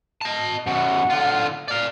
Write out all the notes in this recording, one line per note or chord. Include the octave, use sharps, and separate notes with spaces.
D#5 A5
F#2 B2 F#5
D3 F4
D5 F5